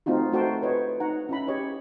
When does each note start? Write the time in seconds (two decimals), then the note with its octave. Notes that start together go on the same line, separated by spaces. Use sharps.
0.06 A3 C4 D#4 F4 F#4
0.32 A3 D#4 F#4 C5 G5 A5
0.62 B4 C#5 D#5
1.00 D#4 F#5 A#5
1.29 C#4 E4 B5
1.47 G4 C#5 D#5